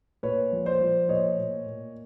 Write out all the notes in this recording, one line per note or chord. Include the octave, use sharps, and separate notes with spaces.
A#2 B4 C#5
F3
C5 D5
F3
A#2 C#5 D#5
A#2
A#2